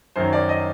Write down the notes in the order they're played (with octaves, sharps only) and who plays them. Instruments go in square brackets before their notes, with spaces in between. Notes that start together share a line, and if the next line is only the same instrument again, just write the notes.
[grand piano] F#2 D#3 F#3 C5
D5
D#5